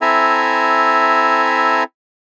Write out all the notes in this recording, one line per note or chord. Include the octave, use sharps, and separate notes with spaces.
C4 E4 A4 E5 G#5 A#5